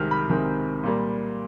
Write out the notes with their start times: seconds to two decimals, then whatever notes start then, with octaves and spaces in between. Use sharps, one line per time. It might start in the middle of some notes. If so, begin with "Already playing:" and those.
Already playing: C2 C3 D#3 G#3 C4 F6
0.11 B5
0.29 C2 C3 D#3 G#3 C4
0.83 A#2 G3 A#3